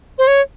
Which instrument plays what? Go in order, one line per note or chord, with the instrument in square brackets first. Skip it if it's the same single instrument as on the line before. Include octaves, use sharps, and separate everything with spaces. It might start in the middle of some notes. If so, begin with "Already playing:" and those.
[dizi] C5
C#5